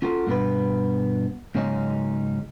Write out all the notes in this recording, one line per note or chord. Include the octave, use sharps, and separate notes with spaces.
C#4 F4 F#4 A4 A#4
G2 B2 B3 B4
G#2 C#3 F#3 C#4 D#4